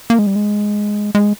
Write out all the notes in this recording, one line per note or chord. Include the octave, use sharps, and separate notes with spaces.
A#3
G#3
G3
G#3
G#3